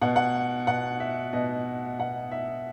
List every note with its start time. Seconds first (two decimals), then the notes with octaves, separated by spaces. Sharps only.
0.02 B2 F#5
0.16 F#5
0.67 B2 F#5
1.00 E5
1.33 B2 D#5
1.99 B2 F#5
2.32 E5